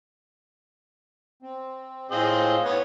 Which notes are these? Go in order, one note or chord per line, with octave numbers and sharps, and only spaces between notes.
C4
A2 C4 F4 G#4 D#5
B3 C#5 F#5